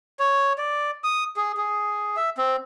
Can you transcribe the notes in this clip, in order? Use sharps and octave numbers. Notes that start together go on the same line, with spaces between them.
C#5
D5
D#6
G#4
G#4
E5
C4